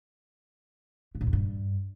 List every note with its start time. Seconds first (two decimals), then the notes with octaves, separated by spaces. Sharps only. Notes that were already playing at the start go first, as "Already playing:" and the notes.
1.15 B2
1.21 A2
1.27 E2
1.33 G2